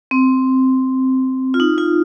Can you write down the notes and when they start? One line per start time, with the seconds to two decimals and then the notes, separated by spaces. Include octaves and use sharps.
0.11 C4
1.54 F4
1.60 D#4
1.78 F4